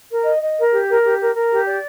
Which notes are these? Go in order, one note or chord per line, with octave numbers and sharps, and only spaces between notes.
A#4
D#5
D#5
A#4
G4
A#4
G4
A#4
A#4
G4
D5